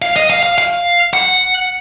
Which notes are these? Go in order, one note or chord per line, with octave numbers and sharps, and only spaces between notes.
F5
D#5
F5
F5
F5
F#5